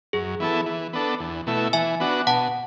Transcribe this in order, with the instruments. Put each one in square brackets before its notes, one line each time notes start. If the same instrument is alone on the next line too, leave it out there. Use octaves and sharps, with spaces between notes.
[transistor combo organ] F#2 [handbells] G#4
[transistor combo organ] E3 B3 E4 A4
E3
B3 D4 A4
E2
B2 A3 E4
[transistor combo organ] E3 [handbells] E5 G#5
[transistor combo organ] B3 D4 F#4
[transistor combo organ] B2 [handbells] F#5 A5